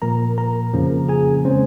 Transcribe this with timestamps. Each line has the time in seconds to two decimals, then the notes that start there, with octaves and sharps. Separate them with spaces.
0.02 A#2 F3 A#3 A#4 A#5
0.38 A#4 A#5
0.73 F2 C#3 F3 A#3 C#4
1.09 G#4 G#5
1.44 C#3 G#3 C4 C#4 C5